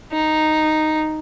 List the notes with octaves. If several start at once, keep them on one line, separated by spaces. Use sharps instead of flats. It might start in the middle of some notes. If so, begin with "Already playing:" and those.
D#4